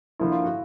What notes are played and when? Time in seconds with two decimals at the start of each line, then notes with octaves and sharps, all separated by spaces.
0.19 D3 F3 A#3 E4
0.32 F4
0.44 F#4